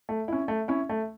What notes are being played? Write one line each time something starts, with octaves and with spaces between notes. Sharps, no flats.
A3
C#4 E4
A3
C#4 E4
A3